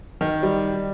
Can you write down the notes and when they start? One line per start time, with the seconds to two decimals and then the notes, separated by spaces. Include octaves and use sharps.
0.21 D#3
0.43 G3